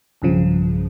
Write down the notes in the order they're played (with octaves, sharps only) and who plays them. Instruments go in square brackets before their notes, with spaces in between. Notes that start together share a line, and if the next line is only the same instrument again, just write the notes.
[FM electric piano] B1 G2 C#3 F3